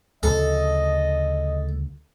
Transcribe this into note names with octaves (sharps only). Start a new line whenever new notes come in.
D2 C#3 F3 A4 D#5